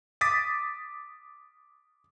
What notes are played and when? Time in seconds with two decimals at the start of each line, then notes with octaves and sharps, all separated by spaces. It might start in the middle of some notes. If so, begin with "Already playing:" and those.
0.21 D6 D#6 A6 B6